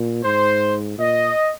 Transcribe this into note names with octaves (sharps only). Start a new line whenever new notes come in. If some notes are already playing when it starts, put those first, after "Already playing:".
Already playing: A#2
G#2 C5
A#2 D#5